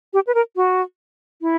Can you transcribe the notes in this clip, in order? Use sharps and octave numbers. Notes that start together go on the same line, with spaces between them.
G4
B4
A#4
F#4
E4